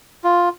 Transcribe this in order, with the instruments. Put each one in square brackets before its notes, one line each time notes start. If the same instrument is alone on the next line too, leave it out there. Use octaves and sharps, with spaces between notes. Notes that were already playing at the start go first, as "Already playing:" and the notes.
[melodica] F4